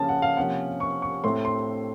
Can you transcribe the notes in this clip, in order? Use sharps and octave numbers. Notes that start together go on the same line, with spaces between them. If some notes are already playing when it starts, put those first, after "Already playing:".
Already playing: C#3 F3 A#3 C#4 A5
F#5
F5
C3 F3 A#3 C#4 F#5
C#6
C#6
A2 A3 C4 C6
C6